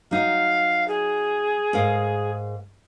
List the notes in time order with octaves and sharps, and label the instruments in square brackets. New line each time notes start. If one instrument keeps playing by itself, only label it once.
[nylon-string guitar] F#3 D#4 [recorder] F5
[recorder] G#4
[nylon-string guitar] G#2 A#4 F5